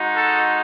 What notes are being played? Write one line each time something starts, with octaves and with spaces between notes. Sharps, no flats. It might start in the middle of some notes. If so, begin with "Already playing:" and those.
Already playing: G#3 D#4 F#4
A4